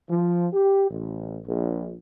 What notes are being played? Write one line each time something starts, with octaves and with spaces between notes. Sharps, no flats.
F3
G4
A1
A#1